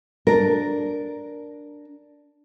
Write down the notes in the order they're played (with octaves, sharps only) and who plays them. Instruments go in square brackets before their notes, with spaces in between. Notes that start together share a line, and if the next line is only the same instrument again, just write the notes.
[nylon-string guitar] D4 A#4